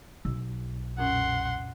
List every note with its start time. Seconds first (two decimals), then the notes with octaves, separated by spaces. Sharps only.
0.25 B1 E6
0.98 F2 A#2 C#4 F#5 C6